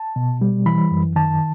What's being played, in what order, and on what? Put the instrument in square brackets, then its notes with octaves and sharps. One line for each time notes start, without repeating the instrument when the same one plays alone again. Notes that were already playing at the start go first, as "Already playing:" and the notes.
Already playing: [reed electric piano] A5
B2
G3
E3 B5
F#2
D#3 A5